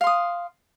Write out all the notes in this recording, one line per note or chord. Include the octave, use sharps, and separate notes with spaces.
F5 C6 D#6